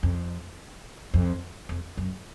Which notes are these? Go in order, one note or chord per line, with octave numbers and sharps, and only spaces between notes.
F2
F2
F2
F#2